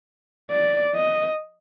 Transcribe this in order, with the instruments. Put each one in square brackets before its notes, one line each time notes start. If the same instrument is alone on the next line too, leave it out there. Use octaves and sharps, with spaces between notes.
[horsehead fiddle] D5
D#5